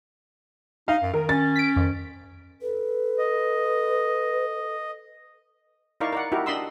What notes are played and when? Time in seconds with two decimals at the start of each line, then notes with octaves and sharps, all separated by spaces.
0.88 D#4 F5
1.02 F#2
1.14 D#3 A#4
1.29 C#4 A6
1.56 B6 D7
1.76 F2 D#3
2.62 A4 B4
3.19 D#5
6.00 D#4 E4 A#4 D5 F5 C#6
6.12 A#4 D5 F#5
6.32 D#4 E4 F#4 G4 A#4
6.46 D4 D#5 B5 C6 E6